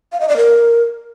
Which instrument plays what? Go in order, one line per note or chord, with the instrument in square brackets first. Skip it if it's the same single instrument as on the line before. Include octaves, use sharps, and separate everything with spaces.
[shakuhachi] F5
D#5
D5
A#4